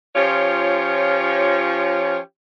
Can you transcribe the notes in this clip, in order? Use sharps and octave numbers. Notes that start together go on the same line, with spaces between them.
F3 C#4 F4 G4 C#5